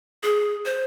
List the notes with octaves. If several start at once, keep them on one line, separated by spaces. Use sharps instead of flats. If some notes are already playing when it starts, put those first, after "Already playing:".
G#4
C5